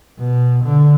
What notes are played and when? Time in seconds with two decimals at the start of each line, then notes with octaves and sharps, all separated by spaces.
0.19 B2
0.64 D3